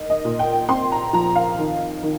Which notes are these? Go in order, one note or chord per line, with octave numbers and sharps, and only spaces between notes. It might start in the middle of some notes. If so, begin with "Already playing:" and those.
Already playing: D#4 A#4
D#5
A#2
G5
C4 C6
A#5
F3 A#5
F5
D#3
D#3